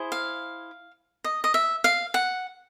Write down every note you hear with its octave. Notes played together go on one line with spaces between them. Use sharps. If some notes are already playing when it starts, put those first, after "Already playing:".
Already playing: E4 G#4 C5
F5
D#5
D#5
E5
F5
F#5